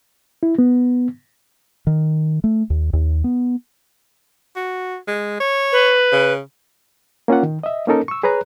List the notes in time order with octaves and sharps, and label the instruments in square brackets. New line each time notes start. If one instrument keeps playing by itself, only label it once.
[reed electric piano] E4
B3
[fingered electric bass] D#3
A3
D#2
D#2
B3
[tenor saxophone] F#4
G#3
C#5
[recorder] B4
[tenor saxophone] C#3
[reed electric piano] A#3 C#4 F4 F#5
D#3
D#5 E5
A#3 C#4 D#4 A4 A#4
C#6 E6
G#4 B4 C#5 A#5 F#6